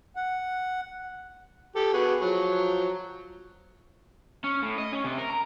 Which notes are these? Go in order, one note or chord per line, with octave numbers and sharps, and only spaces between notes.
F#5
G4 A4
B3 F#4 G#4
F3 F#3
C#4
A2
D#5
C#4
C3
A#4
A#5